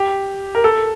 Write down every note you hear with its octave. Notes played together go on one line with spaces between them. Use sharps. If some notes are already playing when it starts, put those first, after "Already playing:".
Already playing: G4
A#4
A4